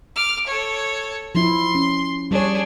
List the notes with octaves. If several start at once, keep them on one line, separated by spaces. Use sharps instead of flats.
D6 F6
A4 C#5
F3 E4 C6
C#4
G3 D4 G#4 C#5